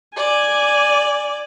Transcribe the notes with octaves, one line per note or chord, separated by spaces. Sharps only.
D5 G#5